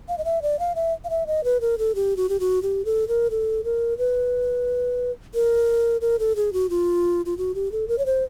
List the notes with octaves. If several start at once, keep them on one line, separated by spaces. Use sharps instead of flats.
F5
D#5
E5
D5
F5
E5
F5
E5
D#5
B4
A#4
A4
G4
F#4
G4
F#4
G4
A4
A#4
A4
A#4
B4
A#4
A#4
A4
G#4
F#4
F4
F4
F#4
G4
A4
A#4
C#5
C5